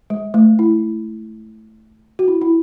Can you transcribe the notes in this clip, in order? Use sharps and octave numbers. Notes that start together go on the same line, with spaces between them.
G#3
A3
E4
F#4
E4
E4